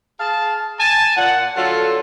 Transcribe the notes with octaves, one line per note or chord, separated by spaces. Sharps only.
G#4 F5 A5
G#5 A5
A#2 F#5
D3 F#3 F4 A4